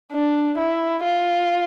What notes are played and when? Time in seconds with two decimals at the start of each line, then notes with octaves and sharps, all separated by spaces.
0.12 D4
0.58 E4
1.04 F4